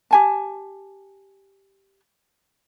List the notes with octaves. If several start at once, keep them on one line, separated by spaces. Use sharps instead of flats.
G4 G#5 A5